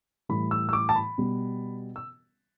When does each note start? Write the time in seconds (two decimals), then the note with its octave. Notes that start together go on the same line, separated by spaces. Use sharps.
0.29 A2 E3 G3 B5
0.51 E6
0.69 E6
0.73 D6
0.89 A5
0.96 B5
1.18 B2 G3
1.96 E6